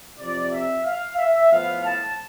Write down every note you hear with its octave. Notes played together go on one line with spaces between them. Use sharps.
F2 C3 F3 D5
E5
F5
E5
A2 F3 B3 F5
A5